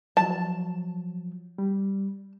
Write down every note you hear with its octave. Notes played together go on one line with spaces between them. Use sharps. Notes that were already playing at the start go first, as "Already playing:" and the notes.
F3 F#3 A5
G3